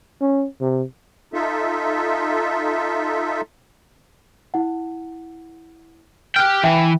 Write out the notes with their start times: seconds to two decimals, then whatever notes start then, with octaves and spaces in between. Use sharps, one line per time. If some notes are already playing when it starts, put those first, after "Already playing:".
0.21 C#4
0.61 C3
1.33 D#4 F4 A4 E5
4.54 E4 F#5
6.36 G4 G5 F6 F#6
6.64 E3 E5 G5 G#5